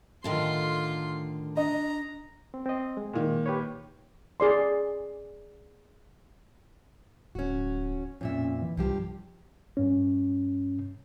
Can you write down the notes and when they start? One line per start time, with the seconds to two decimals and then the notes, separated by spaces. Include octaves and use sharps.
0.24 A2 D3 D#3 F4 C6
1.57 D4 D#5 A#5
2.54 C4
2.66 C4 D#5
2.97 G#3
3.13 A#2 D#3
3.46 G4 B4 C#5
4.40 G#4 D5 C6
7.35 D1 C#4 F#4
8.21 F2 A#2 C#4 E5
8.62 E3
8.77 C2 G2 F3 G4
9.77 G2 C#4